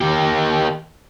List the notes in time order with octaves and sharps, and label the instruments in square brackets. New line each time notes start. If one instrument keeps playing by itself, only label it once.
[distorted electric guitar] D#3 G4